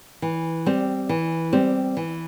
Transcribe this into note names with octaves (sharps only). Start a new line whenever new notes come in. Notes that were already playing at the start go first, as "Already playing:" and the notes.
E3
G3 C4 G4
E3
G3 C4 G4
E3